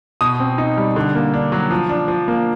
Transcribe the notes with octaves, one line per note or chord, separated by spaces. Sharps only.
B2 D#6
C4
D#4
G3
D3
A#3
D4
F#3
F3
D4
F3
A#3